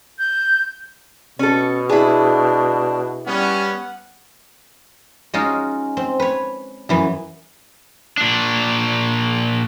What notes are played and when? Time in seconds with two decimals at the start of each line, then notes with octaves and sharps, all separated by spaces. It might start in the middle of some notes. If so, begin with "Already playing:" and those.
0.18 G6
1.39 B2 C#4 A4
1.89 D4 E4 G#4
3.27 G3 B3 C#4 F#5
5.34 G#3 C#4 D#4 F4 F#4
5.97 C4
6.20 B4 C#5
6.89 F#2 E3 B3
8.18 A#2 D4